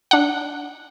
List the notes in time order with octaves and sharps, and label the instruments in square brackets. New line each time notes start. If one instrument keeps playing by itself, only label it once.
[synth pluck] D4 F#5